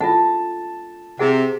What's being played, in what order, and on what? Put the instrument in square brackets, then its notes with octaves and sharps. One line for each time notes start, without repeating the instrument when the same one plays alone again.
[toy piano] F4 A4 F#5 [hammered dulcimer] A5
[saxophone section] C3 [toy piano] E4 G#4 F#5